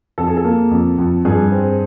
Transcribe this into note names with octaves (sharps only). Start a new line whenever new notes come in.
F2 A4
G#4
A4
A#3
F2
F2
G2 G#4
C4